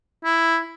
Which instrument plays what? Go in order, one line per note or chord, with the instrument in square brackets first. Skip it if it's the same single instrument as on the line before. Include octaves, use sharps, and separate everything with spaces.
[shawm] E4